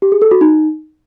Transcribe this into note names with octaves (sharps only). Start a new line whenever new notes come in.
G4
G#4
A4
F#4
D#4